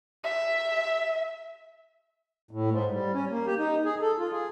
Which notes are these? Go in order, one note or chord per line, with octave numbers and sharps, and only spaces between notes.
E5
A2
G#2
G3
C#4
A#3
G4
D#4
G#4
A4
F4
G#4